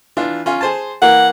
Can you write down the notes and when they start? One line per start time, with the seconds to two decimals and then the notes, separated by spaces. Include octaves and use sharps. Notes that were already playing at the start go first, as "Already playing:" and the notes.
0.17 E3 D4 F4
0.46 C#4 F4
0.61 G#4 C5 A5
1.02 E3 A#3 A#4 F#5